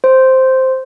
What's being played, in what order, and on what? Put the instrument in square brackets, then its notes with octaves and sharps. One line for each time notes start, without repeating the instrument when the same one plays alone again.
[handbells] C5